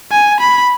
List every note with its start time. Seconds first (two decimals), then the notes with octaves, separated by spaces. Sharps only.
0.12 G#5
0.41 B5